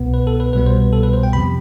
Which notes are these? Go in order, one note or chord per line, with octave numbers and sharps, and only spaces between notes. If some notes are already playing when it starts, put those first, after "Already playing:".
Already playing: C2 B2 B3
B4
A4
B4
C2 B2 G3 B3 B4
C5
B4
A4
B4
C5
G5
F2 C3 F3 B5